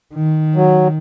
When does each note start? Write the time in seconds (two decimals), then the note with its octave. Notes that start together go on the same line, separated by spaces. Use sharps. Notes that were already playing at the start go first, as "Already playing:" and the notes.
0.14 D#3
0.55 F#3